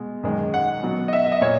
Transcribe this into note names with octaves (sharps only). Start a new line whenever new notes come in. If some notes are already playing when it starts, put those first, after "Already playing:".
Already playing: B2 G#3
F#2 D#3 G#3
F#5
B2 F#3
D#5
E5
E5
D#5
A#2 C#5